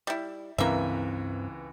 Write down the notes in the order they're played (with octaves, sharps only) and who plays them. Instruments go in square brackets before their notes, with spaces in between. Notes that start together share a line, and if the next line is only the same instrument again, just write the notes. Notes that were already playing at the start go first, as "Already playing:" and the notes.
[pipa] G3 E4
[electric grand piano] C#2 E3 B4 [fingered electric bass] G2 C4 [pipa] A#3 E5